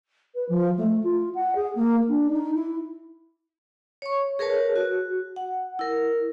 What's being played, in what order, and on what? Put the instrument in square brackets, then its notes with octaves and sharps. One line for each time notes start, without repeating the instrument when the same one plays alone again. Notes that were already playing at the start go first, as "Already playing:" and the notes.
[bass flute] B4
F3
A3
F4
F#5
G#4
A#3
D4
D#4
E4
[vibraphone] C#5 C#6
G#4 A#4 B4 C#5 A5
F#4
F#5
E4 A#4